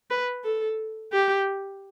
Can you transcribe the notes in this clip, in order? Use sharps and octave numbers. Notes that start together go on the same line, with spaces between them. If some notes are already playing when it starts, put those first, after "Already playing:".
B4
A4
G4